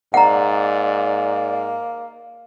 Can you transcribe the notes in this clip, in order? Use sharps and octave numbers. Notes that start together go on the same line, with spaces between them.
G#2 A#3 D5 F#5 A#5